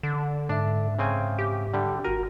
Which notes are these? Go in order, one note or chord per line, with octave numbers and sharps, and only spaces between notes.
D3
G#2 D4 E5
C#3 C4 G#5
G4
D3 G3
G1 F#4 A#4